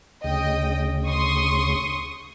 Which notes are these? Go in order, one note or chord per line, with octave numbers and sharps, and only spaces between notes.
D2 C#3 D#5 G5
C6 C#6 D#6